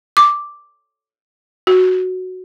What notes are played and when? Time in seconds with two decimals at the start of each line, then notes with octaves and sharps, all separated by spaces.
0.17 D6
1.67 F#4